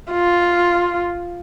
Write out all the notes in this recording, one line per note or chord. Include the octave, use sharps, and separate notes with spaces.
F4